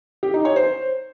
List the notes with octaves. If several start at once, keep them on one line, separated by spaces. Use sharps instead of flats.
G4
D#4
C#5
C5